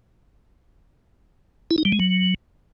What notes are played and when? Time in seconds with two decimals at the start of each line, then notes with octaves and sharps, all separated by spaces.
1.71 E4
1.78 D#4
1.85 G3
1.92 G#3
2.00 F#3